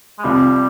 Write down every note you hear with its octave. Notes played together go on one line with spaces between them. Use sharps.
G#3
C2 C3 F3 G3